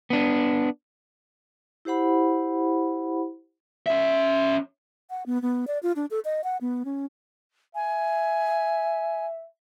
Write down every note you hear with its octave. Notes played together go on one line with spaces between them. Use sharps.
B3 D4
E4 G4 C5 F#5 B5
C#4 E5
F#5
B3
B3
D5
F4
D4
A4
D#5
F#5
B3
C#4
E5 G#5